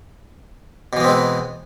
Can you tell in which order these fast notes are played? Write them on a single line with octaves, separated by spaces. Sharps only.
B2 E3 B3 C4 G#3